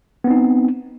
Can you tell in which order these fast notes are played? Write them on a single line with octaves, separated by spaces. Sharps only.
B3 C4 D#4